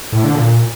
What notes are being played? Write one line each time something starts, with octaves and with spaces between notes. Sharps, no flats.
A2
D3
A#2